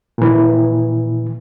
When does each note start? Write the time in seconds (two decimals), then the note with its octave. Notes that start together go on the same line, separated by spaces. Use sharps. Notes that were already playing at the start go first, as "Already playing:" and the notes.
0.18 A#2 E3